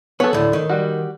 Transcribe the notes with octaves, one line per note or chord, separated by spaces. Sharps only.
B3 A4 C#5
D2 A2
D#3
G3 F#4